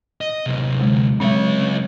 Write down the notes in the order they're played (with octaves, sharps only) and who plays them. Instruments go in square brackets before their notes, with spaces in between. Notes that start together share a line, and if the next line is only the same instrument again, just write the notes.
[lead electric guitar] D#5
C3 F#3
[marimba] D3 G#3
[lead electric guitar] C#2 C#5 [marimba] F#3 G#3 C4